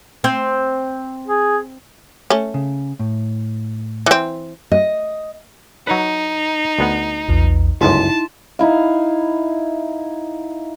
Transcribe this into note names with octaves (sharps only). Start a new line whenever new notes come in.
C4
G#4
A3 C#4
C#3
A2
E3 C4
D#5
F#3 D#4 B4
D2 B3 F#5
A#1 E2
G1 C#2 F#2 D#4 E4 A5 C6
D#4 E4 F5